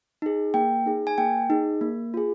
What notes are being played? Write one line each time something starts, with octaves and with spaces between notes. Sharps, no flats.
D#4 G#4
A#3 G5
D#4 G#4
G#5
A#3 G5
D#4 G#4
A#3
F4 G#4